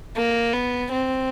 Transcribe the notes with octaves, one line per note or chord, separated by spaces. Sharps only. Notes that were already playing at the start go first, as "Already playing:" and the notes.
A#3
B3
C4